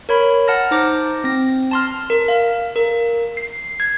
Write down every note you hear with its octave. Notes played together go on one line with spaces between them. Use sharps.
A#4 C#5 B5
F#5 A5 F6 A#6
D#4 C5 D6 A#6
C4 A#6
A5 C6 F6
A#4
F5
A#4
C7
G#6